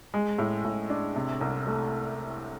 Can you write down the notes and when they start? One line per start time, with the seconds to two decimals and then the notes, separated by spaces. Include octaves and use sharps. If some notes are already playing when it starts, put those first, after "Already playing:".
0.14 G#3
0.38 A2
0.64 A2
0.90 D4
1.16 C3
1.41 C2
1.67 A3